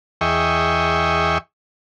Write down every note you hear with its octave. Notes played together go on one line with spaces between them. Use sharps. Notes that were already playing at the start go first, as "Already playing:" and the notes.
E2 G#4 D#5 E5 G5 C#6